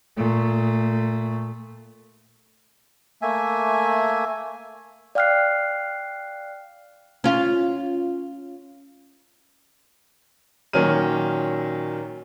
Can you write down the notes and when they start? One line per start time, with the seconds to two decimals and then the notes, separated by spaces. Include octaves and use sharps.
0.16 A#2 A3
3.22 A3 A#3 E5 G#5
5.15 D5 F5 G5 F6 F#6 C7
7.24 C#4 F4
10.73 A#2 D#3 F#3 C#4 F6 D#7